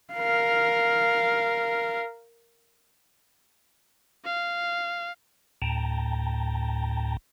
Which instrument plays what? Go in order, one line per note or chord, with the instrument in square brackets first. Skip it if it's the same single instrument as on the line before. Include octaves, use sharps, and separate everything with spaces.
[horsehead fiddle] A#4 F5
[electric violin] F5
[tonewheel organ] D2 A2 G5 A5 A#5